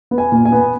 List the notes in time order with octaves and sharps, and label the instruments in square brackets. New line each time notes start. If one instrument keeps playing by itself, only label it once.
[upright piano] B3
G#5
A#2
G#5
B3